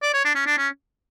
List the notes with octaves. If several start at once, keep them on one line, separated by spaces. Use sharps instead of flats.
D5
C#5
D4
C#4
D4
C#4